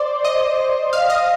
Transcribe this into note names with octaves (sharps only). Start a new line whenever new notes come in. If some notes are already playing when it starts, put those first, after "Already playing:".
Already playing: C5 D5
D#5
F5
D#5